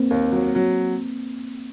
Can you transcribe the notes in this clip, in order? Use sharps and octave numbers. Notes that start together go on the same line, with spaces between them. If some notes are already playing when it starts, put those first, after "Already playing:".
Already playing: A#3 C4
D#2
F#3
F#3